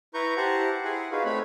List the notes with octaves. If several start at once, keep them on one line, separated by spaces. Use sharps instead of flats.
E4 B4 A#5 C#6 G6
E4 G4 C5 F#5 A5 A#5
E4 G#4 F#5 G#5
D#4 F4 F#4 G#4 B4 F5
A3 C4 C#5 B5